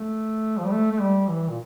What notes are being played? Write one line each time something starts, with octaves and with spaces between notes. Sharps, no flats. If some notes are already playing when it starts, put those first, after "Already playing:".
Already playing: A3
F3
G3
A3
A3
G3
E3
A#2